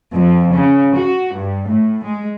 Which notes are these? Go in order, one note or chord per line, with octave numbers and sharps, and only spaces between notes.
F2
C#3
F#4
G2
A2
G#3